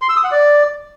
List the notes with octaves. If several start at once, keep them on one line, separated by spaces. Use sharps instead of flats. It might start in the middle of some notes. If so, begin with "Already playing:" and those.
C6
E6
D#6
F#5
D5